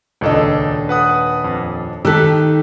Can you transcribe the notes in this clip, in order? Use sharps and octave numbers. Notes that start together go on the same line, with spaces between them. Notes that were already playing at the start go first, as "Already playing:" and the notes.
D#1 C#2 D4 A4 D#5
B4 F#5 D#6
F2
D#3 G4 A4 E6 F#6 B6